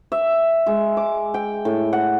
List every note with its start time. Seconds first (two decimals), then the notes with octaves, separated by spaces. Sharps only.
0.12 E5
0.66 G#3
0.97 D6
1.34 G5
1.65 A2
1.93 F#5